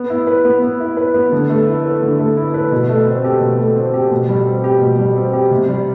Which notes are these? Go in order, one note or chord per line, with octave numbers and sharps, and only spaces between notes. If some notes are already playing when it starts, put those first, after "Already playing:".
Already playing: B3
E4
B4
B3
B3
E4
B4
B3
D3
A3
E4
B4
D3
A3
E4
B4
B2
A3
C4
G4
B2
A3
C4
G4
B2
G3
C4
G4
B2
G3
C4
G4
C3
G3